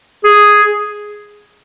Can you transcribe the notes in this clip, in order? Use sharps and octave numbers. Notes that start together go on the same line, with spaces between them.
G#4